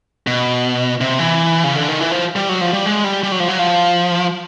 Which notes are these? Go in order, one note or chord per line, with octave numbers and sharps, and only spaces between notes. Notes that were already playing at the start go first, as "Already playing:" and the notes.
B2
C3
E3
C#3
D3
D#3
E3
F3
G3
F#3
F3
G3
G#3
G3
G3
F#3
F3
F#3
F3